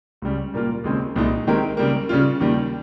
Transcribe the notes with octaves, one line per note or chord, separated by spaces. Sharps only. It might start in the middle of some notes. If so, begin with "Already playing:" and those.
C#2 C#3 G3
A#2 G3 A#3 F4
D#2 C#3 G#3 C4
C2 A#2 G#3 D#4
D#3 G#3 C4 G4 A#4
C#3 G3 A#3
C#3 G3 C#4 F4
D#2 D#3 G3